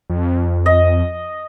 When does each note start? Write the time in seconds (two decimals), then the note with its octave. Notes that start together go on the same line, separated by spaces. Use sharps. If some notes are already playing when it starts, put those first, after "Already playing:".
0.10 F2
0.66 D#5